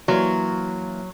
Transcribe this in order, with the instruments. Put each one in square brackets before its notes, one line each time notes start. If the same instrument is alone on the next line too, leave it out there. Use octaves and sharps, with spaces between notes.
[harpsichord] E3 A#3 F4 [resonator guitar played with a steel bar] F#3